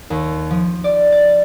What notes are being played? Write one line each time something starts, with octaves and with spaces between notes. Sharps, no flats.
D#2
F3
D5
A6